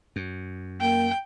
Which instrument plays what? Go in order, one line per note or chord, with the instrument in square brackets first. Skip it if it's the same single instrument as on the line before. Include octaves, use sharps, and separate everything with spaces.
[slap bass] F#2
[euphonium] A#3 [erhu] G5